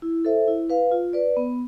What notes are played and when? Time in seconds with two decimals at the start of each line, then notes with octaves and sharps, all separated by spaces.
0.02 E4
0.25 A4 C5 E5
0.48 E4
0.70 B4 F5
0.91 F4
1.13 B4 D5
1.37 B3